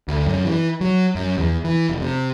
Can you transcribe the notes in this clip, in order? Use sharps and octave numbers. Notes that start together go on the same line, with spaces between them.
D2
F#2
E3
F#3
F#2
E2
E3
F1
C3